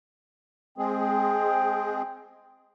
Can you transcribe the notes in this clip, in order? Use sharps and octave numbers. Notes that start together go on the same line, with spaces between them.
G#3 C4 G#4 G5